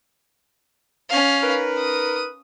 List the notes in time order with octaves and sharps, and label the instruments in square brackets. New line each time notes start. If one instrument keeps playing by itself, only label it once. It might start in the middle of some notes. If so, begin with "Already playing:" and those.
[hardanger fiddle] C#4 F5
[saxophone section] D#4 A#4 B4
[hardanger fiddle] D#6